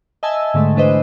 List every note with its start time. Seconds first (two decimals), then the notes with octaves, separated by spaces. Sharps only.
0.23 D#5 E5 G#5 A5 E6
0.54 G#2 D3 G#3 A3
0.75 E3 A3 D4 B4 C5 D#5